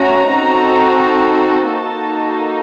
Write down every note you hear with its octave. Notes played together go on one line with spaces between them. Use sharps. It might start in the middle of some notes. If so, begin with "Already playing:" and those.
Already playing: A3 C#4 F#4 A#5
C4 D#4 F#4 A4
A#3 D#4 F#4 A4 A5